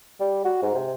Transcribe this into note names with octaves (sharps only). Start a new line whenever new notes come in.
G3
F#4
G#2
C3